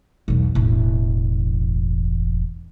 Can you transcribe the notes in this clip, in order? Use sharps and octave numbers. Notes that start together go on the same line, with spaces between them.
B1 E2
E1 A1